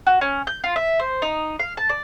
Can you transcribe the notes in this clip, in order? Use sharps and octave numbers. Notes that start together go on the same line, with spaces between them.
F#4
C#4
G6
F4
E5
C5
D#4
F5
A5
D5